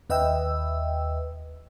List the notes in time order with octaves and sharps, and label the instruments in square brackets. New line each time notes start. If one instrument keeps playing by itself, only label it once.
[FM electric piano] D#2 B4 D#5 E5 G5 E6